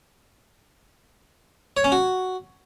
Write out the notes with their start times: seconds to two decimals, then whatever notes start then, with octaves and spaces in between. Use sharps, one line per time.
1.77 C#5
1.84 C#4
1.92 F#4